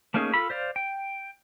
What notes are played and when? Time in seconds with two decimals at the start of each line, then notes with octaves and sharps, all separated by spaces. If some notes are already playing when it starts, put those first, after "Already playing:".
0.14 A3 A#3 C#4 D#4 G#4
0.34 F4 A4 B5
0.50 C5 D5 F5
0.76 G5